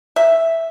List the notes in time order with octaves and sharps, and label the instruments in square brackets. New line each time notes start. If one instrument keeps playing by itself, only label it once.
[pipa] E5